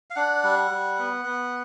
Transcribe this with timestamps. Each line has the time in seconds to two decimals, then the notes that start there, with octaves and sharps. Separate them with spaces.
0.10 F5
0.16 D4 F#5
0.44 G3
0.71 G3
0.99 B3
1.25 B3